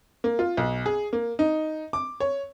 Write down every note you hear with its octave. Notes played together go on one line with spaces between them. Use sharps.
A#3
F4
B1
G#4
A#3
D#4
D6
C#5